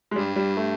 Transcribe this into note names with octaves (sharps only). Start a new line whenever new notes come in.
G#3
G2 G3
G3
A3